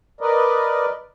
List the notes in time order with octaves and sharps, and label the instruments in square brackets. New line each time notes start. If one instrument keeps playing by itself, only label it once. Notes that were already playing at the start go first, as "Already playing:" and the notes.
[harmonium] A#4 B4 D5 D#5